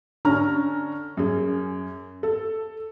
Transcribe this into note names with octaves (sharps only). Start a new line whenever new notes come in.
D3 C#4 A#5 F6
F#2 G#4
A4